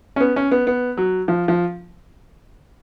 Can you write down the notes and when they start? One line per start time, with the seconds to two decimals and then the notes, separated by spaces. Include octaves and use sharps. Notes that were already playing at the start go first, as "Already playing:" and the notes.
0.16 C#4
0.20 B3
0.36 C#4
0.51 B3
0.67 B3
0.97 F#3
1.28 F3
1.48 F3